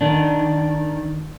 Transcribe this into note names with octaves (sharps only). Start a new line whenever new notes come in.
D#3 D4